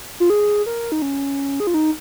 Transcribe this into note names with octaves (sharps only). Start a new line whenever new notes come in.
F4
G#4
A#4
D#4
C#4
G#4
F4
D#4